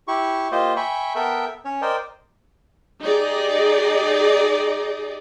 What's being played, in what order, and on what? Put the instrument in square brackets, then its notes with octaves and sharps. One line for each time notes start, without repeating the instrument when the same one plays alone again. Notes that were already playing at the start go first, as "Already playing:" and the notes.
[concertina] E4 G4 C#6
A#3 F4 G4 C5 D#5
E5 G5 G#5 B5 C#6
B3 A4 A#4 E5 G5 E6
C#4 C#5
A#4 C5 D5 D#5 G5
[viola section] D#4 G4 G#4 D5 D#5